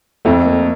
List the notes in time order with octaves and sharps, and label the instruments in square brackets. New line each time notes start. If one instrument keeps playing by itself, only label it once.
[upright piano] F2 [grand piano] A3
[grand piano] A#3